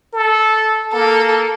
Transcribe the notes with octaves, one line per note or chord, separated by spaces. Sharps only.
A4
A#3 A4